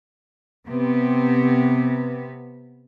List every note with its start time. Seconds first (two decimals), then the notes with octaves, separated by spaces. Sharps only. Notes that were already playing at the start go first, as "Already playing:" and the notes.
0.67 C3 B3